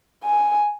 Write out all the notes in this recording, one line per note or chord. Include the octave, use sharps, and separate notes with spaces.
G#5